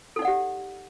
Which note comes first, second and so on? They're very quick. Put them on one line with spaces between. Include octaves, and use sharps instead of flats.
A4 D#4 D5 F#5 G4